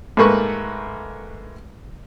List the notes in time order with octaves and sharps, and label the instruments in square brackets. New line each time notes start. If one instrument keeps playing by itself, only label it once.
[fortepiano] G#2 A3 A#3 B4 C#6